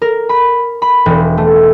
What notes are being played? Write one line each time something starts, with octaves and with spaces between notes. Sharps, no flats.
A#4
B5
B5
E1
A3